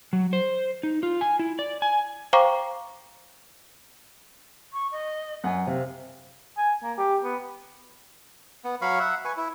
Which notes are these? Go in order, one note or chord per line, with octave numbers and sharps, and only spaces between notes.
F#3
C5
D#4
F4
G#5
E4
D5
G#5
C5 F5 G5 A#5 C#6 D6
C#6
D#5
F#2 F#5 G#5
C3 F5
G#5
A#3
G4
B3
B3
F#3 F5 B5 C#6
E5 F#5
B4 G#5 C#6
E4